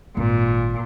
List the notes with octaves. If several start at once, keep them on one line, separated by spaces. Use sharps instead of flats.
G#1 A#2